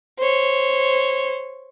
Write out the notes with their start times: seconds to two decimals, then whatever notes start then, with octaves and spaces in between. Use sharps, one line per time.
0.18 C5 C#5